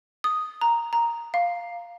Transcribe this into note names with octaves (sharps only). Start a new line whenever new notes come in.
D#6
A#5
A#5
F5